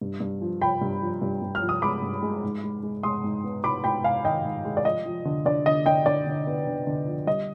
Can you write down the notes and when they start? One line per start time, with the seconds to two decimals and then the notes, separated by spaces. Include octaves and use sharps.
0.01 G2
0.20 G2
0.42 F3
0.61 F3 G5 B5
0.81 G2
1.02 F3
1.22 G2
1.42 G2
1.55 F6
1.62 F3
1.69 D#6
1.82 G#3 B5 D6
2.02 G2
2.23 G#3
2.43 G#2
2.63 G#3
2.83 G#3
3.03 G#3 C6 D#6
3.24 G#2
3.44 B3
3.64 G#2 B5 D6
3.84 G#2 G5 B5
4.04 G#2 F5 G#5
4.25 D#3 D#5 G5
4.45 G#2
4.65 G#3
4.77 D5
4.85 F3 D#5
5.06 F3
5.25 D3
5.45 D3 D5
5.66 D3 D#5
5.86 D3 D#5 G5
6.06 D3 D5
6.27 D3
6.46 B3
6.67 D3
6.87 D3
7.07 F3
7.27 G3 D#5